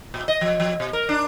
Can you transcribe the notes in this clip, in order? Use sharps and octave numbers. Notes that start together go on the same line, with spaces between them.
A#2
D#5
F3
F3
B2
A#4
D4